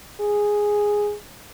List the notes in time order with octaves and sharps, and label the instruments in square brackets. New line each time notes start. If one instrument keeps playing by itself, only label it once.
[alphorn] G#4